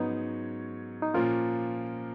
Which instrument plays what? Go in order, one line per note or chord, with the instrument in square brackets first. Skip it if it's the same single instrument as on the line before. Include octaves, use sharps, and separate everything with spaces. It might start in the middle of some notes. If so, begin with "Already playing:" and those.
Already playing: [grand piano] G#2 F#3 C#4 [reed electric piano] B3 D#4
[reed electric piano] D#4
[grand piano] A#2 F3 A#3 [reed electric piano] C#4 F4